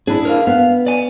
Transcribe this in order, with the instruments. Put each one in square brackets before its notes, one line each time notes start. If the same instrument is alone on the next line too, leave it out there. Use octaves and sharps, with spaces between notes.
[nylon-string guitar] D4 E4 [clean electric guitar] G#4
[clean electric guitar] A#4 C5 F5
[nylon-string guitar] B3 [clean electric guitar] F5
[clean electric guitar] D5 G#5